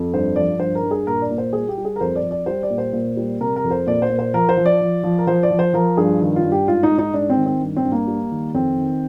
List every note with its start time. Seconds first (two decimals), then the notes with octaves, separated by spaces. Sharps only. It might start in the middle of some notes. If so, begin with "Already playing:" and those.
Already playing: F2
0.13 G2 C5
0.36 F3 D5
0.60 G2 C5
0.75 A#4
0.83 G2
0.91 G#4
1.07 A#2 A#4
1.22 D5
1.31 A#2
1.38 C5
1.53 G3 G#4
1.68 G4
1.77 G3
1.85 G#4
1.96 A#4
2.01 F2 C5
2.16 D5
2.23 F2
2.31 D5
2.46 G3 C5
2.63 D5
2.70 A#2
2.78 C5
2.93 A#2
3.17 G3
3.40 C3 A#4
3.56 A#4
3.64 F2
3.71 C5
3.86 A#2 D5
4.02 C5
4.10 A#2
4.19 C5
4.34 F3 A#4
4.49 C5
4.57 F3
4.66 D5
4.81 F3
5.03 F3
5.18 A#4
5.27 F3 C5
5.43 D5
5.51 F3
5.59 C5
5.73 F3 A#4
5.97 G2 G#4
6.21 D#3
6.36 F4
6.44 G2
6.52 G4
6.67 G#2 F4
6.83 D#4
6.91 G#2
6.98 D#4
7.14 G#2 D4
7.30 C4
7.37 D#3
7.46 C4
7.62 G2
7.76 C4
7.85 G2
7.92 A#3
8.08 G3
8.31 D#3
8.54 F2 C4
8.78 D#3